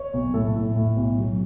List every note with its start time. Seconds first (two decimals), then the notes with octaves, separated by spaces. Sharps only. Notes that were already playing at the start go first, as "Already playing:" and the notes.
Already playing: C#5
0.13 B1
0.34 A2 A4
0.55 A2
0.76 A2
0.96 B1
1.18 F#3